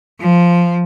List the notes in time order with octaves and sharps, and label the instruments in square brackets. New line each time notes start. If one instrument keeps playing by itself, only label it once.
[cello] F3